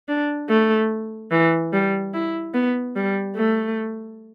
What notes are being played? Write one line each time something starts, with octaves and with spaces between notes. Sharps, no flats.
D4
A3
E3
G3
E4
B3
G3
A3